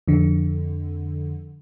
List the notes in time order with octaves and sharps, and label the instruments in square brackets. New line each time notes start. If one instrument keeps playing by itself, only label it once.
[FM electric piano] F2 D3